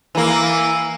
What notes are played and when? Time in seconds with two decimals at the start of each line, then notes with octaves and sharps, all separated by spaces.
0.15 E3 A#3